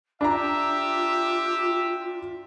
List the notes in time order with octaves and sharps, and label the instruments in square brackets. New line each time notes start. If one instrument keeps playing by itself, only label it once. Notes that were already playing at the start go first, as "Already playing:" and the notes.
[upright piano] D4 A#5 [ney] F4 [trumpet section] G4 E5